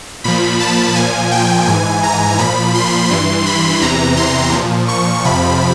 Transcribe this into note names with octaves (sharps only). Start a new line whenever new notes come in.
A#2 F3 B5
A5
A#2 F3 G#5
G5
G#2 E3 G#5
A#5
A#2 F3 B5
C6
G2 E3 C6
B5
E2 C3 E3 A#5
C6
A#2 F3
C#6
F2 C3 F3 B5